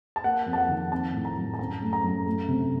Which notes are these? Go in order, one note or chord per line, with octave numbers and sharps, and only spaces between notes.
A5
A#3 F#5
F2
A5
F#5
D#3
C4 A5
A2
A#5
F#3
A5
F#2 A#5
A3
A#5
F#2
A3
C3